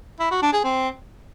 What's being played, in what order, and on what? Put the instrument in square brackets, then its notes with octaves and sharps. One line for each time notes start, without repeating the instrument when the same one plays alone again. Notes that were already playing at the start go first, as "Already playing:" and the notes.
[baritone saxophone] E4
F#4
D4
G#4
C4